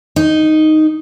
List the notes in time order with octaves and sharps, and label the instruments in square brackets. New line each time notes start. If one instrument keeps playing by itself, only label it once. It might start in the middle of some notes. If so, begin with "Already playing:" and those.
[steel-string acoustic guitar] D#4